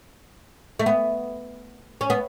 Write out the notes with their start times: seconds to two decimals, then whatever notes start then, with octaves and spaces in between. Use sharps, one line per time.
0.79 A3
0.86 B3
2.01 C#4
2.10 B3